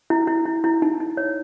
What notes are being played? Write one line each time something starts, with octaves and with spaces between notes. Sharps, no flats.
E4
E4
E4
E4
D#4
D#4
C#5